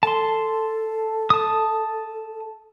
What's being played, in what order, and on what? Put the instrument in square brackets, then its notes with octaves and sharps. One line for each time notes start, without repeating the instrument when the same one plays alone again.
[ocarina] A4 [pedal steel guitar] A5 C6
[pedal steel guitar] A5 D#6